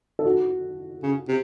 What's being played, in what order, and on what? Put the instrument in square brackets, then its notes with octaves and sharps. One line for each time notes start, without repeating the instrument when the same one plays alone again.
[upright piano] A4
F#4
[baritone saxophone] C#3
C3